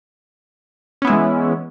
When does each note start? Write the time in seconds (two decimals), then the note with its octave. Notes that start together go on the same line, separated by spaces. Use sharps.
1.02 C#4
1.05 B3
1.07 E4
1.10 G#3
1.13 E3